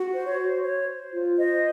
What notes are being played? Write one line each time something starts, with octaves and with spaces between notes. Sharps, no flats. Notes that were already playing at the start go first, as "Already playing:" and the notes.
Already playing: F#4
C5
C#5
C5
C5 C#5
C5
F4
C5 D#5